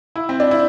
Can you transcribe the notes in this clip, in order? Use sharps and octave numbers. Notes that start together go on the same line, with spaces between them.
E4
C4
D4
E4